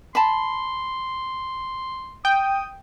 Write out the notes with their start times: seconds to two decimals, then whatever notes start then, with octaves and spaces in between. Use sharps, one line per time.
0.15 A5 B5 C6
2.25 G5 D#6